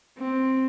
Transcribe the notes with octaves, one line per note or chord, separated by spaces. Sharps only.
C4